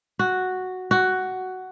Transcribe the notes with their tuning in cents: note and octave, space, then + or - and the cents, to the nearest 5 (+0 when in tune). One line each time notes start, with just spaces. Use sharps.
F#4 +0
F#4 +10